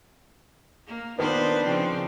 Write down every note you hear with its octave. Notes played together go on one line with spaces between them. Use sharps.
A#3
D#3 B3 D4 F4 B4 C5
C#3 F3 C4